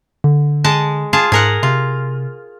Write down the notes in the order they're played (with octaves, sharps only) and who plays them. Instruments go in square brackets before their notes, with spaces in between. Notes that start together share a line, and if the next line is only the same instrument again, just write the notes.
[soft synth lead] D3
[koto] G#3 D#5 A5
F4 G#4 A5
[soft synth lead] G#2 [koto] G#4 A#4 F#5
[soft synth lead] C3 [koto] F4